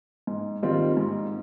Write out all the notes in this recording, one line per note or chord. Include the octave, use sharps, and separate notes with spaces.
G#2
D#3 G3 C4 F4
G#2